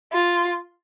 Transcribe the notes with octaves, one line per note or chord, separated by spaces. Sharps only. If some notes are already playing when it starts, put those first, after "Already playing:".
F4